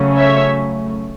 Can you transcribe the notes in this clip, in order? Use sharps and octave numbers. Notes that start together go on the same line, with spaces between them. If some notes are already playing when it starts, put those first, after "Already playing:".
Already playing: C#3 F#3 A3 C#4
C#5 E5